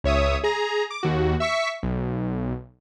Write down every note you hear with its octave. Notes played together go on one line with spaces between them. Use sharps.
C#2 C#5 E5 D#6
G#4 A#5
D6
D#2 F#4
E5 C#6 B6
B1